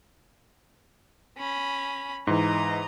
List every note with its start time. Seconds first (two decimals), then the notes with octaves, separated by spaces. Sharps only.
1.37 C#4 B5
2.27 G#2 E3 D#5 A#5